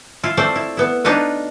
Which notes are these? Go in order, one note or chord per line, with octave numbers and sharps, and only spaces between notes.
E4 F4
A3 C4 C5 D5
E4
B3 E4
D4 D#4 F4 B4 C#5